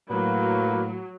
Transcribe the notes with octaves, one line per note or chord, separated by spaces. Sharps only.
A2 F#3 A#3 B4